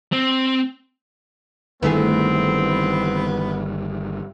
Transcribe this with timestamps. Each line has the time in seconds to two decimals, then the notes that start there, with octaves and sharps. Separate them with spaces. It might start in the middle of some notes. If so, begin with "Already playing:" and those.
0.12 C4
1.83 G1 G2 D#3 E3 A3 B3 C4 G#4